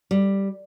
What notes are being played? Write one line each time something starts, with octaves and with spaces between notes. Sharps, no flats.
G3